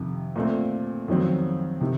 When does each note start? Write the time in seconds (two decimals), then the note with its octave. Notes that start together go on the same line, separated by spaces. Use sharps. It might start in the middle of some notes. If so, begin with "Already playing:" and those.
Already playing: F2 C3 D#3
0.36 A#2 A3 C4
1.08 F2 D#3 F#3 C4
1.81 C3 D#3